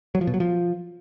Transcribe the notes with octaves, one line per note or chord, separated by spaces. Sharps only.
F#3
F3
B2
F#3
F3